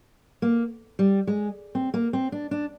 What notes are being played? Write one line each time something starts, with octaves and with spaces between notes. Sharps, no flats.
A#3
G3
G#3
C4
A#3
C4
D4
D4